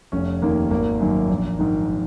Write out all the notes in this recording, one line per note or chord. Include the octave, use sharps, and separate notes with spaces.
F1 C#4
D#2 D#3 A#3
G#1 A#3
F#2 D#3
A#1
G#2 D#3